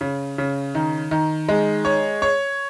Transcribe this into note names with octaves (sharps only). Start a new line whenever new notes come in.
C#3
C#3
D#3
D#3
G#3
C#5
C#5